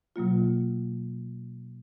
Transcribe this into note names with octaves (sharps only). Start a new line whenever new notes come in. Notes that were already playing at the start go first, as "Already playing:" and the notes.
B2 F#3 A#3 F4